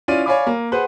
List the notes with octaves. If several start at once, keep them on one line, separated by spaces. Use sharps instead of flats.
C#4 E4 F4 D5 D#7
C#5 D5 F5 G#5 B5 D6
A#3
G#4 B4 C5 F#5